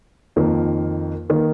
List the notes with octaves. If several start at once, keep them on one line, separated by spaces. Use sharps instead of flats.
F2 D#3 A#3
D#3 A#3